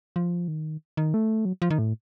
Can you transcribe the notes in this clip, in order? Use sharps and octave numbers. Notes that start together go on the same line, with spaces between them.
F3
D#3
D#3
A3
F#3
F3
D#3
A2